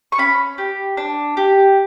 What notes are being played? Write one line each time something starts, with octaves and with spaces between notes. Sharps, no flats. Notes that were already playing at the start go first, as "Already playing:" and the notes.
C#6
C#4 B5
G4
D4
G4